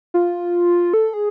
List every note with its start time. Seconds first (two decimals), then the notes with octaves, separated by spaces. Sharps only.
0.14 F4
0.94 A4
1.14 G#4